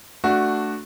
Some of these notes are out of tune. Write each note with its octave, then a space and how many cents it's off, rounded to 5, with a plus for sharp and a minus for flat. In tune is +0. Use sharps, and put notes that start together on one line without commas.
A3 +0 D4 +0 F#4 +0